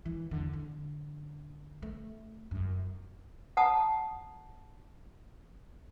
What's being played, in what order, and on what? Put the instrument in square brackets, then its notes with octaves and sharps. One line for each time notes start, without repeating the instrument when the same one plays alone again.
[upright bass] E3
E2 D3
D3
A3
F1 F#2
[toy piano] F#5 A5 A#5 D#6